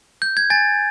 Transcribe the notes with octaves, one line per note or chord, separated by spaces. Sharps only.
G6
G#6
G#5 A6